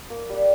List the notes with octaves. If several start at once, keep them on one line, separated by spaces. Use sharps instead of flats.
A#3
G3